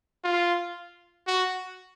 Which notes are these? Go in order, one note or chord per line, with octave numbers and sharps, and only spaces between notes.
F4
F#4